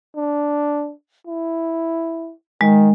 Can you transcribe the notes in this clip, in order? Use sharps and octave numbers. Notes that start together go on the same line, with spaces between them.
D4
E4
D#3 G#3